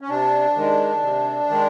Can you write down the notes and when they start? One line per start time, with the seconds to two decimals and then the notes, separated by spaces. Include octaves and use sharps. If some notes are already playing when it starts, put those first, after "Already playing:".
0.01 C#4
0.10 C3 D4
0.56 D#3 G#3
1.03 C3
1.49 D#3 G#3